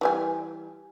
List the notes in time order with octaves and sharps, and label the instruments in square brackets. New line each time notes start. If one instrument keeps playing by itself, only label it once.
[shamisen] E3 G3 G#5